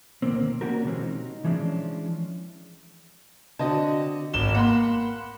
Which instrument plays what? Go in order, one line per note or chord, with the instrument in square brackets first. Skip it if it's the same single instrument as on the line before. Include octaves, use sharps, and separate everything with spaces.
[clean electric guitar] D2 G#2 B2 D#3 A#3 C4
A#3 C#4 D4 F#4 G4 A#4
B2 D3 E3 G#3 C4 C#4
D#4
E3 F3 G#3 C#4 D4
[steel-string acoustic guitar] D3 C4 F#4 [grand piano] D#5 A5
[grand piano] G#1 E7 G7
[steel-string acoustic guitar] A#3 [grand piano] F#5 B5 C6